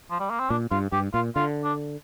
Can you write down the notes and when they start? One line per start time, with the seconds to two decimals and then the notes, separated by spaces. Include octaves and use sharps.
0.11 F3
0.20 G3
0.31 A#3
0.40 C4
0.50 A#2 D4
0.71 G2 F4
0.92 G2 G4
1.14 A#2 F4
1.36 D3 F4
1.64 D4